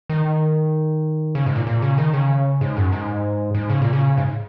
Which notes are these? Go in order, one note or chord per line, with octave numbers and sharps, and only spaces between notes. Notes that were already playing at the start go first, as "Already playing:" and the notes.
D#3
C#3
G#2
A#2
A#2
C#3
D#3
C#3
G#2
F#2
G#2
G#2
C#3
A#2
C#3
G#2